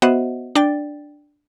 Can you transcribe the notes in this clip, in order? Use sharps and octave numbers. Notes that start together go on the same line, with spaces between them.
B3 F#4 C5 D#5 E5 F#5
D4 D5 G5 A6